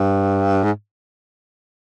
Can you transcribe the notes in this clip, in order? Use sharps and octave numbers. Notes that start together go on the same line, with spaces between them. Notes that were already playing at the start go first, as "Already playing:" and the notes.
Already playing: G2
G#2